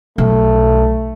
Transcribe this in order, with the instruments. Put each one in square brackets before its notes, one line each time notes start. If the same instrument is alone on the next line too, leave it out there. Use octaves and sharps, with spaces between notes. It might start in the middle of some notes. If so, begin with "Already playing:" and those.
[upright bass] B1 [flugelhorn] A3